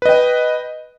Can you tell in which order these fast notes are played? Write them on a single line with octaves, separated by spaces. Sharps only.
B4 D#5 G5